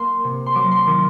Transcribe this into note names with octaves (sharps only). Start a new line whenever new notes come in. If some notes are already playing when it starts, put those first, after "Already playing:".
Already playing: A#3 C6
C3
C6
F#3 D6
C6
D#3 D6